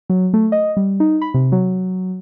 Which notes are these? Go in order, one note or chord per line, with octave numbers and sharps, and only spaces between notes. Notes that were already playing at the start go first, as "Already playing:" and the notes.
F#3
A3
D#5
G3
D#4
B5
C3
F#3